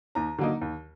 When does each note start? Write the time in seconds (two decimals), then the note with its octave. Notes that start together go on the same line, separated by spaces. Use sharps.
0.15 D#2 A#5
0.38 D3 F#3 A#3 D#4
0.61 D#2